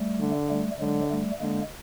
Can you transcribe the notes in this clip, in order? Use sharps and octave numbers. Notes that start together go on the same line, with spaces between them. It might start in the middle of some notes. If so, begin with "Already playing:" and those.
Already playing: G3 A3
D3
G3 A3
D3 F#3 G#3
G3 A3
D3 G#3 A#3